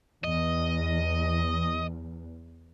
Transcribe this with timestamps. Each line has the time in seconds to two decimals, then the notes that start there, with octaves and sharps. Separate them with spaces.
0.24 E2 D#5